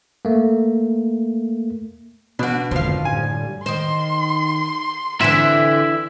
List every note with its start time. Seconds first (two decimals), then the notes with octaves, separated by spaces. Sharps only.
0.25 A3 A#3
2.39 B2 D4 F#4
2.71 G#1 F2 D3 F3 F5
3.05 F#2 A2 G3 G#5
3.66 D#3 C5 C6
5.20 D3 E3 C4 E4 E5